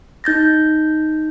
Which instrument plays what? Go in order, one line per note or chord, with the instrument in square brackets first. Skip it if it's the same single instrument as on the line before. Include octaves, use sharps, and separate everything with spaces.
[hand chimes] D#4 G6 A6 A#6